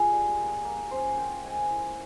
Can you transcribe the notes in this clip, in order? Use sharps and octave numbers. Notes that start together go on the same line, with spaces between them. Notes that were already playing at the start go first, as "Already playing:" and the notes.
Already playing: F4 G#4
G3
A#3
A#3
C#4 C5
A#3 G5
G#3 G#5
E4